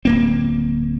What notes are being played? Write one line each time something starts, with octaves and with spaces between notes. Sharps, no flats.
D1 A#3 C4